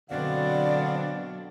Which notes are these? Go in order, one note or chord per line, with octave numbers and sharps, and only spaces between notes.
B2 D3 F#3 C4 D4 D5 F5 F#5